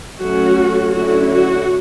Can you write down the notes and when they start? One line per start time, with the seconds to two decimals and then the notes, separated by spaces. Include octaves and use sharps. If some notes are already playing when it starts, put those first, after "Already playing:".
0.19 F#3 A3 C#4 F#4
0.94 D3 F#3 A3 C#4 E4 F#4
1.33 F#4